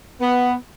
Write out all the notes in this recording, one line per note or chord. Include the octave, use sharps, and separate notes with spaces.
B3